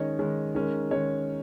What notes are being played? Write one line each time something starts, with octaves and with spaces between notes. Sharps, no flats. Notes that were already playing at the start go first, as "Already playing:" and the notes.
Already playing: D#3 G#3 C#4 C#5 D#5
D#3 G#3 C#4
D#3 G#3 C#4 A#4
D#3 G#3 C#4 C#5